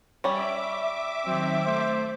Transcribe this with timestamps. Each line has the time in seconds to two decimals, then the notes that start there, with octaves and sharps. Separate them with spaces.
0.24 G3 C#4 E5 D6
1.26 D#3 F#3 C4
1.66 A3 C5